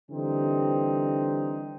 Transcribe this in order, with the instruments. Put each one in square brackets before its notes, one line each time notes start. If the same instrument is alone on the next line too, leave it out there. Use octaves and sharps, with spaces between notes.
[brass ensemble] D3 E3 G3 C4 D#4